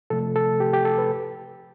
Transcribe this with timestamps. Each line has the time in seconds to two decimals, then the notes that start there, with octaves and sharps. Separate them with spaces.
0.10 C3 F3 A3 A4
0.36 A4
0.60 G4
0.73 G4
0.85 A4
0.98 B4